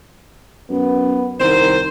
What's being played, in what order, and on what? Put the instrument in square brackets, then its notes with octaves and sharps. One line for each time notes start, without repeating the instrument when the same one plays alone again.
[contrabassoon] F#2 [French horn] B3
[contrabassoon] C2 [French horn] D#3 [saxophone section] C5